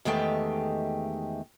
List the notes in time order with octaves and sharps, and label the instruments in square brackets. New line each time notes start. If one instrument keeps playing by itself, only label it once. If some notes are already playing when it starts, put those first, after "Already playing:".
[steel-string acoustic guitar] E2 D#3 G#3 A3 G4 G5